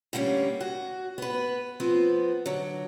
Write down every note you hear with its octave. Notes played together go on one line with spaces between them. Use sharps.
D3 G3 A#3 B3 C#4
F#4
B3 B4
F3 B3 C4
D3 F#3